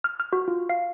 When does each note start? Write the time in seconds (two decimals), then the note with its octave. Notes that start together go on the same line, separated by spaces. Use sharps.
0.04 F6
0.20 F6
0.33 F#4
0.48 F4
0.69 F5